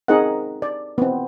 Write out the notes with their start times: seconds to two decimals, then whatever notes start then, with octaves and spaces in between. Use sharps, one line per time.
0.08 C4 D#4 G#4 A#4 D#5 F#5
0.62 D5
0.98 B3 C4